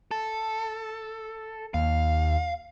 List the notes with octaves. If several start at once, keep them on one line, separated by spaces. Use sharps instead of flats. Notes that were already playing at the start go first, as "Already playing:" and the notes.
A4
D#2 F5